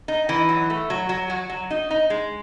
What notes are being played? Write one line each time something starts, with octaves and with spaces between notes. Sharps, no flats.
D#4
E3
F#3
A3
F#3
F#3
F#3
F#3
D#4
D#4
G#3